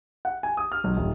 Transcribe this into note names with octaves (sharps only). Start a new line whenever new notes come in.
F#5
G#5
D#6
F6
B1
D#1